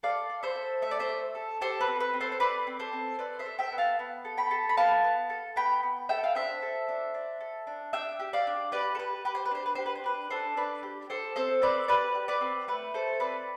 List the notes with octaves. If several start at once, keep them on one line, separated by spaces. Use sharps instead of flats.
A4 D5 F5
A4
C5 E5
A4
A3 E5
D5
C5 E5
A3
A4
G4 A4 C5
B4
C4
B4
C4
A4 C5
C5
C4 B4 D5
C4
A4 C5
C4
A4 B4 D5
C5 E5
A4
E5 G5
B3
F5 A5
B3
A4
G5 B5
A4
B5
B3 F5 A5
B3
A4
B3 G5 B5
B3
A4 E5 G5
F5
D4 C5 E5
A4
D4
D4
A4
D4
D4 E5 G5
G4
D5 F5
D4
G4 B4 D5
A4
G4 B4
G4 B4
C5
B4
D4 C5
B4
G4 C5
B4
C5
D4 B4
D4 A4 C5
D4 B4 D5
G4
G4 A4 C5
C4 A4 C5
C4 B4 D5
G4 B4 D5
G4
B4 D5
C4
A3 B4
A3 A4 C5
C4 B4 D5